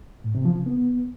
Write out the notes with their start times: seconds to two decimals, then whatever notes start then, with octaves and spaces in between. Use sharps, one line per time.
0.24 A2
0.35 C3
0.45 F3
0.56 C#3
0.66 B3